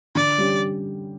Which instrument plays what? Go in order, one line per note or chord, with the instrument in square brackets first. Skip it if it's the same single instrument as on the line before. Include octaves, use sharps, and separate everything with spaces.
[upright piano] D3 [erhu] D5
[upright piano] G3 C#4 G4